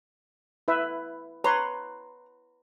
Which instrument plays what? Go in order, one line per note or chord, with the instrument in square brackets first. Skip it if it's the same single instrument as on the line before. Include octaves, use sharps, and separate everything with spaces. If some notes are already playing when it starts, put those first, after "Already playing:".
[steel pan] E4 B4 E5
[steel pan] B4 C#5 C6 [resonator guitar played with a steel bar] A#5